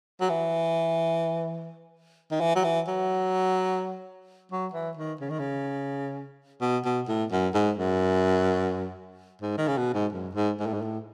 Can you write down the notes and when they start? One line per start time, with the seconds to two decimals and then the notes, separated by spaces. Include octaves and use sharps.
0.21 F#3
0.30 E3
2.31 D#3
2.41 E3
2.56 F#3
2.64 E3
2.88 F#3
4.52 F#3
4.74 E3
4.97 D#3
5.21 C#3
5.30 D#3
5.39 C#3
6.61 B2
6.85 B2
7.08 A2
7.32 F#2
7.55 G#2
7.78 F#2
9.42 G#2
9.58 D#3
9.68 C#3
9.78 B2
9.94 G#2
10.13 F#2
10.35 G#2
10.60 G#2
10.67 A2
10.73 G#2
10.82 A2